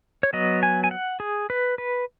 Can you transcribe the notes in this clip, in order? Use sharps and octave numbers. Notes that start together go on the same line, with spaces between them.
C#5
F#3 B3 D#5
G#5
G#5
F#5
G#4
B4
B4